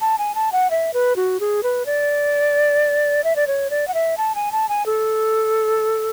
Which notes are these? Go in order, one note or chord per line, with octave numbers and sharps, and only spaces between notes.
A5
G#5
A5
F#5
E5
B4
F#4
G#4
B4
D5
E5
D5
C#5
D5
F#5
E5
A5
G#5
A5
G#5
A4